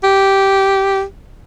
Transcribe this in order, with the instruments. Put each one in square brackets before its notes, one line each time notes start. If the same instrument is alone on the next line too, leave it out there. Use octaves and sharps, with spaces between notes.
[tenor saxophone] G4